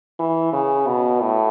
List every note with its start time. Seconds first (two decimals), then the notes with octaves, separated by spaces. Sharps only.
0.19 E3
0.53 C#3
0.87 B2
1.21 A2